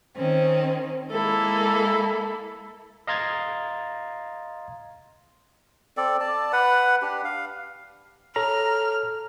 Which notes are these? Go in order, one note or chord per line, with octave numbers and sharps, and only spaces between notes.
D#3 C4 C#4
G#3 A#3 E4 A4
D#5 F5 A#5 C6 G#6 A6
C4 A4 D5
D5 A5
B4 F#5
D4 G4
F5
A4 C#5 A#5 F6